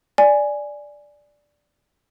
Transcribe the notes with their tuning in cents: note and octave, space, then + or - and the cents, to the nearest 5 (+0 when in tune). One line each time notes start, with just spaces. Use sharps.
D5 +0 G#5 +0